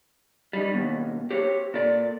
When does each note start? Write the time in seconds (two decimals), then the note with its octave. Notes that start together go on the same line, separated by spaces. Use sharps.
0.53 G3 D#4
0.74 D#2 B2
1.31 G4 C5 C#5
1.74 A#2 A4 D5